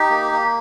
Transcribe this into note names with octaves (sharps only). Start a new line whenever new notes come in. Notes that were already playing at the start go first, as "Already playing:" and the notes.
Already playing: D#4 G4
A#3
A#3